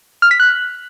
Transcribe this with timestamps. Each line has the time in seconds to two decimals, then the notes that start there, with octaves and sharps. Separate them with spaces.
0.22 F6
0.31 B6
0.40 F#6